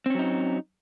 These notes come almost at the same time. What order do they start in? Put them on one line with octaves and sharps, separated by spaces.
C4 C#4 F#3 D#4